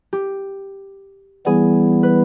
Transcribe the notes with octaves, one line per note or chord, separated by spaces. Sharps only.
G4
E3 G3 B3 E4 G#4
B4